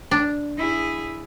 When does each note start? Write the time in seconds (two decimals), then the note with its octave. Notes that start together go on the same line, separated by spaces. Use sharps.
0.11 D4
0.57 E4 G#4